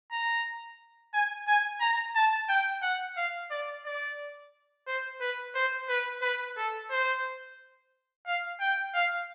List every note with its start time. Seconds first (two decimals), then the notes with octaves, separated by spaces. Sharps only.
0.12 A#5
1.14 G#5
1.48 G#5
1.81 A#5
2.16 A5
2.49 G5
2.83 F#5
3.17 F5
3.51 D5
3.85 D5
4.87 C5
5.21 B4
5.55 C5
5.89 B4
6.22 B4
6.57 A4
6.91 C5
8.27 F5
8.61 G5
8.95 F5